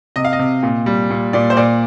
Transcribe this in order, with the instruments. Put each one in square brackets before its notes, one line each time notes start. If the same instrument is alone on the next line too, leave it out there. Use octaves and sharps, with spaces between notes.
[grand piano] C3 D#5
F5
D#5
C3
A#2
G3
A#2
A#2 D5
C5
A#2 D5